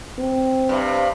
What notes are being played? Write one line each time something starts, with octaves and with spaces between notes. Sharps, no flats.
C4
G2 C3